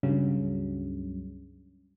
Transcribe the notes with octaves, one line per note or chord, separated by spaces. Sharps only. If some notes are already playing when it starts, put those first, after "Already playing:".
C#2 G2 C#3 F#3